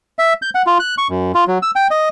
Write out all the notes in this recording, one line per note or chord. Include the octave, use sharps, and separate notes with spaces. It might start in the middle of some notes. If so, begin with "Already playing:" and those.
E5
G6
F#5
F4
F#6
C#6
F#2
F4
F#3
E6
G5
D#5